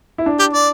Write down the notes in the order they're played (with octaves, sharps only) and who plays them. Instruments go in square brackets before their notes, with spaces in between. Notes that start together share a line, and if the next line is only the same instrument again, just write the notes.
[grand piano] E4
D4
[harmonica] G4
D5